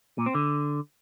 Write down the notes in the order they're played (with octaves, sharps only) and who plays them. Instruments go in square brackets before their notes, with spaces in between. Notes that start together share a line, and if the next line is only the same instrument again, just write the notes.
[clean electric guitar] A#2
C4
D3